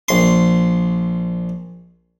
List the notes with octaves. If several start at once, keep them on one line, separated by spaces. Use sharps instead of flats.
A#1 C6